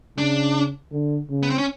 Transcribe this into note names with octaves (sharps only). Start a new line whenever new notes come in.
C#3 D4
D3
C#3
B3
C4
C#4